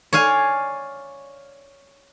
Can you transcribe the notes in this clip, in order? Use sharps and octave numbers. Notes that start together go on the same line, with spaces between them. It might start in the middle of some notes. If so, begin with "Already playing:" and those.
C#5 D5 F5 G#5